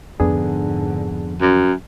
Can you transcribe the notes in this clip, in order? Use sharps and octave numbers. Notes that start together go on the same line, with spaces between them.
F2 G#2 D3 B3 D4 G#4
F#2